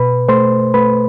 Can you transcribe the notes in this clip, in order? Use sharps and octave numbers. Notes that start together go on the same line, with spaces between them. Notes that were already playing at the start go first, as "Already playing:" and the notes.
Already playing: B2 B4 B5
A3 C5 C6
A3 B4 B5